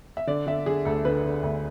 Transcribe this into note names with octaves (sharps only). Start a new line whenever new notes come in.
E5
D3 D5
D3 E5
D3 G#4
D2 A4
D3 B4
D3
D2